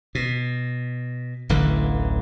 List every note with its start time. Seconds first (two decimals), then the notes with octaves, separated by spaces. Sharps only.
0.15 B2
1.49 D1 A1 D3 E3